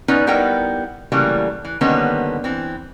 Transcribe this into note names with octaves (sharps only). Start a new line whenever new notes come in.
B3 C#4 D#4 B4 D5
G3 B3 D#4 E4 A#4 G5
C#3 E3 F#3 G3 A3 A#3
E3
D3 D#3 G3 A#3 B3 C#4
E3 C4